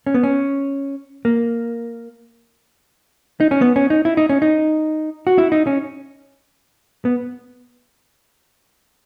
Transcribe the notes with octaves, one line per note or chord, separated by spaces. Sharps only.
C#4
B3
C#4
A#3
D#4
C#4
B3
C#4
D#4
E4
D#4
C#4
D#4
F#4
E4
D#4
C#4
B3